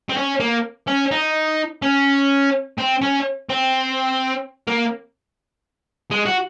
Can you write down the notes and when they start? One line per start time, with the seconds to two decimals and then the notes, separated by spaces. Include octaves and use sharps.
0.09 C4
0.17 C#4
0.40 A#3
0.88 C#4
1.11 D#4
1.82 C#4
2.78 C4
3.01 C#4
3.49 C4
4.67 A#3
6.11 G#3
6.26 F#4